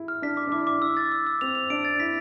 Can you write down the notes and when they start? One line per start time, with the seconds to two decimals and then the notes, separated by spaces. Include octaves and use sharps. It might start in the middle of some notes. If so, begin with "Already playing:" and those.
Already playing: E4
0.08 F6
0.22 D4 B6
0.37 D6
0.47 D4
0.52 E4 D6
0.67 D6
0.82 E6
0.97 A6
1.12 E6
1.27 E6
1.41 C4 F7
1.55 F7
1.70 D4 D7
1.85 A6
2.00 E4 B6